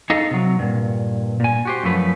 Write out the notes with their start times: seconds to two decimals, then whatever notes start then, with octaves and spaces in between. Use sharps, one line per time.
0.10 D#4 G#4 A4 D#5 F5
0.31 C3 F#3
0.59 G2 A#2
1.40 A#2 G#5
1.65 F#4 G4 C5
1.83 F#2 F3 A3 B4